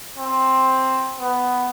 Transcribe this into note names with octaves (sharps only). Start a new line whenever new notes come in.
C4
B3